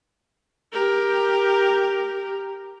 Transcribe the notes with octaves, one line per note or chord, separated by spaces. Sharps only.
G4 A#4